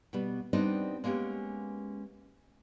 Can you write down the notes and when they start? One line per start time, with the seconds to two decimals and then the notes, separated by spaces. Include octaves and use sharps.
0.13 B2 G3 B3
0.53 G3 B3 C4 D4 D#4 D#5
1.04 G#3 A#3 B3 C#4 G4